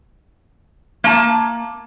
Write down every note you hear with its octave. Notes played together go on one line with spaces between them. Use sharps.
A#3 A5